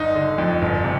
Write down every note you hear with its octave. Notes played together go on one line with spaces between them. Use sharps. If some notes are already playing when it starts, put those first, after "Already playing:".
Already playing: G1 D#4
D3
F2
G1
C3